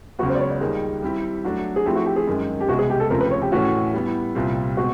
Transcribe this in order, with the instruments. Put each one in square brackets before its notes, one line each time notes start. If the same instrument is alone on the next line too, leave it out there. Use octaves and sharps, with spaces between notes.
[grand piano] C#2 C#3 F#3 B3 [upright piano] F#4
[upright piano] C5
D5
C#5
D5
[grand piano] D#2 D#3 G3 A#3 D#4 [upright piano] G#4
[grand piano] G3 C4 E4 G4
F#3 A3 D4 F#4
[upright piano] G#4
[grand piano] F3 A3 C4 E4 [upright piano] G4
[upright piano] F#4
G4
G#4
[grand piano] F#2 D#3 G#3
[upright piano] G4
[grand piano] C2 B2 G#3 [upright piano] F#4
[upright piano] G#4
G4
A4
[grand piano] D#2 C#3 F3 A3 C4 [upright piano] A#4
[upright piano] B4
C#5
G4
[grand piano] A2 E3 A3 C#4 [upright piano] F#4
[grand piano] G3 B3 E4
C2 A#2 G3 C4 F4
[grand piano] B2 G#3 C4 [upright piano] F#4